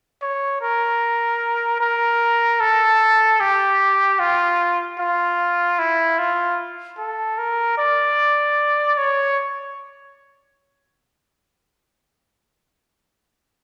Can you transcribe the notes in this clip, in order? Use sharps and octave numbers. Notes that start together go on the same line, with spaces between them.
C#5
A#4
A#4
A4
G4
F4
F4
E4
F4
A4
A#4
D5
C#5